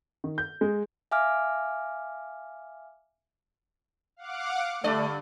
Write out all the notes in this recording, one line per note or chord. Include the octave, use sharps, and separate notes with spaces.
D#3
G6
G#3
E5 F5 G#5 D6 F6
F5 F#5 D6
G2 D3 A3 D5